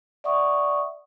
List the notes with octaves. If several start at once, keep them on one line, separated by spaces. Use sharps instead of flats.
D5 E5 F#5 C#6 D#6